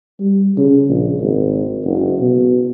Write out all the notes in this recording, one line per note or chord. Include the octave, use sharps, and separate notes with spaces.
G3
C#3
A#1
G#1
F#1
B2